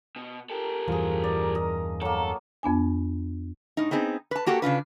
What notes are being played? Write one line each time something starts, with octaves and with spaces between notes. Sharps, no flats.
B2
G4 A4 A#4
E2 G2 E3 F3 G#4
D5
D#5
F#3 A#3 A4
F2 B3 D4 G#5
A2 D#4
B3 C4 D#4 G#4
B4 A5
A#3 F#4 G4 A4 F#5
C#3 D4 F4 B4